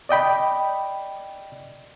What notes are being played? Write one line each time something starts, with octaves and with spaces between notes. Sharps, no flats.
D5 D#5 G5 B5